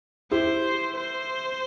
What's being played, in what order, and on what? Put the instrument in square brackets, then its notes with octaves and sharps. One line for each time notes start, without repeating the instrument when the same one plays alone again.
[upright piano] E4 G4 [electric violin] C5
[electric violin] C5